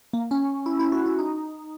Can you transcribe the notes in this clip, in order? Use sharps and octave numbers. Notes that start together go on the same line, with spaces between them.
A#3
C#4
E4
E4
F#4
E4
D#4